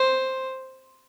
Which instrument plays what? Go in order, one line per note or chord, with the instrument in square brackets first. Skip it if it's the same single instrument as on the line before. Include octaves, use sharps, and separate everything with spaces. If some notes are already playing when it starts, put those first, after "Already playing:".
Already playing: [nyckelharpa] C5